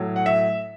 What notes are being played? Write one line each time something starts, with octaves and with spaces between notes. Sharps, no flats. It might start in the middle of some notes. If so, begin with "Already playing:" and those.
Already playing: A2 F#3
F#5
E5